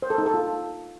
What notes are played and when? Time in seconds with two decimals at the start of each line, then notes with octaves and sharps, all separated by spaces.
0.02 C5
0.10 A4
0.18 D#4
0.26 A4
0.34 F4